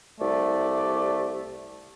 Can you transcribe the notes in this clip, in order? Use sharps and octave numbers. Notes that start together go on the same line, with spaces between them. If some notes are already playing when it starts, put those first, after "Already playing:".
C2 A3 D5